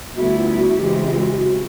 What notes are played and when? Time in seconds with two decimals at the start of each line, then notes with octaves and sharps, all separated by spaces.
0.16 D2 D3 G3 B3 E4 F#4
0.37 F4
0.58 F#4
0.78 F#2 C#3 E3 G#3 C4 G4
0.99 G4
1.10 F4
1.19 F#4
1.31 G4
1.40 F#4